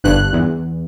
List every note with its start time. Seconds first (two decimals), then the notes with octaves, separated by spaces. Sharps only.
0.04 G1 G2 F#6
0.33 E2